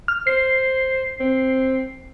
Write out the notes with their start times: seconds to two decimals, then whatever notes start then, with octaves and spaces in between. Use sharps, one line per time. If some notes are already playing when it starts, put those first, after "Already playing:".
0.08 F6
0.27 C5 C7
1.20 C4